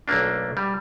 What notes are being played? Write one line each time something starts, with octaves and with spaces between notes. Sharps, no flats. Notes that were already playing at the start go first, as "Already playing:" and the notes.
B1 A3 A#3 D4
G3